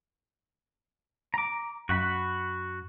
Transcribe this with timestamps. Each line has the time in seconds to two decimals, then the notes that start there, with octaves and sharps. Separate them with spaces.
1.34 A#5 D6
1.89 F#2 F#4 F#5 B5